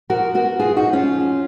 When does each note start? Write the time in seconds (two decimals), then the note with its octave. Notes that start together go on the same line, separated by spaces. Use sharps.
0.10 F3 F#4 A#4
0.34 B3 F#4 A#4
0.59 F#2 F4 G#4
0.77 D#4 F#4
0.85 F#2
0.93 C#4 F4
1.10 F3